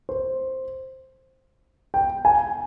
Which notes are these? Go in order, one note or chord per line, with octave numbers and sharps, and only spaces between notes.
C5
G5
G#5